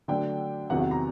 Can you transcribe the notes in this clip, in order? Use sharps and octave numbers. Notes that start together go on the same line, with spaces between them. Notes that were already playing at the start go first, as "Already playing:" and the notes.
D3 F#3 A3 D4 G5
E2 C3 D#3 F#3 F#5
F#5
A#5